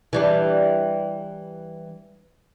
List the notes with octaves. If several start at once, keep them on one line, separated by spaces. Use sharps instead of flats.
E3 G3 D4